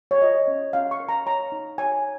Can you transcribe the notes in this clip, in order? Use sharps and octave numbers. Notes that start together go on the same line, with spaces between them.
C#5
F4 D#5
C#4
C#4 F5
C#6
A#4
A#5
C#5 A#5
D#4
C#5 G#5